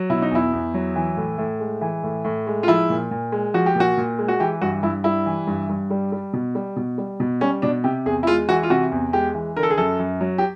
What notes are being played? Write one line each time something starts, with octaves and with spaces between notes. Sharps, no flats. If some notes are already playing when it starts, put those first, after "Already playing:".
Already playing: F#3
B2 E4
D#4
E2 E4
E2
F#3
E3
A2
A2
G#3
E3
A2
A2
G#3
F4
F3 E4
A#2
A#2
G#3
F3 F#4
G4
A#2 F#4
A#2
G#3
F#4
E3 G4
G2 F#4
G2 E4
G3 E4
E3
G2
G2
G3
G3
B2
G3
B2
G3
B2
G3 C#4
B2 D4
C3 G4
E2 G#4
E4
G#3 F4
E3 F#4
F4
C3 F#4
E2
G#3 G4
E3
D3 A#4
A4
G#4
F#2 A4
F#2
F#3
G4